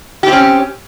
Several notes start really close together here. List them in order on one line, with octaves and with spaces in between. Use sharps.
G4 C4 C#4